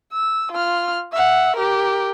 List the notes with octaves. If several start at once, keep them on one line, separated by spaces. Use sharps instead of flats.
E6
F4 F6
E5 F#5
G4 A#4